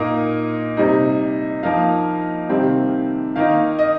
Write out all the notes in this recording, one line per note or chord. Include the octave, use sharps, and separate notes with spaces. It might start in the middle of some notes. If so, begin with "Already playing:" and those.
Already playing: A#2 A#3 D#4 D#6
C3 G3 D#4
F3 A#3 D#4 F5
C3 D#3 G3 C4
D#3 A#3 D#4 F5
D#5